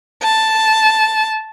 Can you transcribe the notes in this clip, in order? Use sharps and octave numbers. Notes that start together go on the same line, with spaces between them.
A5